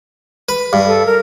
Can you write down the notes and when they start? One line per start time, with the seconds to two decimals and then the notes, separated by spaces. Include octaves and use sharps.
0.49 B4
0.73 G2
0.86 A4
1.06 A#4